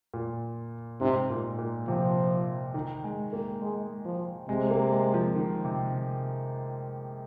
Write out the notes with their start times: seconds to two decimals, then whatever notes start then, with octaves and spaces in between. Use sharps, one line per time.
0.14 A#2
1.00 G#2 C3
1.30 A#2
1.59 A#2
1.88 C3 F3
2.74 D#3
3.04 G#3
3.33 A#3
3.61 G#3
4.05 F3
4.48 C3 G#3
4.70 A#3
4.92 G#3
5.14 F3
5.35 D#3
5.65 C3
5.93 C3